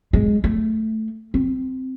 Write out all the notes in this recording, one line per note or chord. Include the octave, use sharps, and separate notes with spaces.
G#3
A3
C4